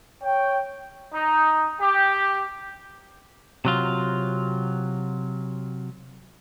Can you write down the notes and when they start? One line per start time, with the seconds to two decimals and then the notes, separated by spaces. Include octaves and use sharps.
0.23 C#5 G5
1.13 D#4
1.80 G4
3.65 C3 F#3 F4